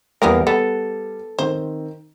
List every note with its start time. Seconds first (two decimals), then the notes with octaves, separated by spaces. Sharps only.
0.22 E2 E3 G3 A#3 B3 A#4
0.47 B3 A4
1.39 D#3 C4 C5